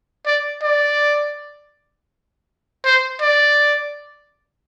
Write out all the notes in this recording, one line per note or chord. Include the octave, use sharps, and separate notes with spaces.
D5
D5
C5
D5